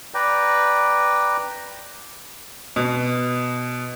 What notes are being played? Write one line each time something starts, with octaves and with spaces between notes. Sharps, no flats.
B4 D5 G5 A#5
B2